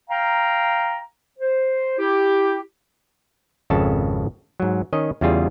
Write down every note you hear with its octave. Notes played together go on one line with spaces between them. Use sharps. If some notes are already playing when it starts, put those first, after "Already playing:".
F5 G5 A#5
C5
E4 G4
G#1 F2 C#3 A4 A5
G#2 F#3
D#3 C#4 D#5
E2 C#3 G3 F4 G#4